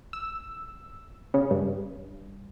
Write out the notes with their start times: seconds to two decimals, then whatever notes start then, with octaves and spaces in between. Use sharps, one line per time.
0.13 E6
1.34 C#3
1.51 G2